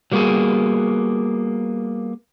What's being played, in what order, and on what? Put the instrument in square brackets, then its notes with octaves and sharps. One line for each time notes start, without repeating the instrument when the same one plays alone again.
[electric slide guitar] F#3 G3 A#3 B3 F#4 G#4